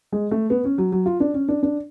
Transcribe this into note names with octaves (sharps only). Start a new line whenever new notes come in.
G#3
A3
B3
C#4
F#3
F#3
F4
D4
C#4
D4
D4